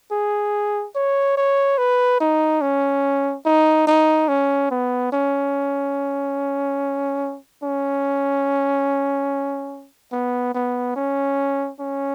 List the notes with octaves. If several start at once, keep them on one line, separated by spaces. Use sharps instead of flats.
G#4
C#5
C#5
B4
D#4
C#4
D#4
D#4
C#4
B3
C#4
C#4
B3
B3
C#4
C#4